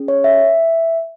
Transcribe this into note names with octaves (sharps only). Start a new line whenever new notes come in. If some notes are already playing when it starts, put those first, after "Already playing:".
Already playing: C#4 G#4
C#5
E5